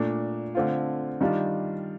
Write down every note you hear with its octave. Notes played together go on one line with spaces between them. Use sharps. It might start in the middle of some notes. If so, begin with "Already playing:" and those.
Already playing: A#2 A3 D4
D3 A3 C4 F4
D#3 G3 D4 F4